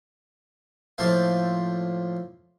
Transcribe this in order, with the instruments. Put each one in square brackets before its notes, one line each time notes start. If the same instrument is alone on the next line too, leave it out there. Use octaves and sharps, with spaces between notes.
[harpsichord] A2 F3 A#3 A4 C5 F5